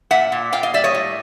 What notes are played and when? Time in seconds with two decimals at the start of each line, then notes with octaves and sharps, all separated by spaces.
0.11 A#2 E5 F#5
0.32 A#2
0.52 A#2 F5 G5
0.63 D#5 F5
0.74 G3 D5 E5
0.84 C#5 D#5
0.94 A2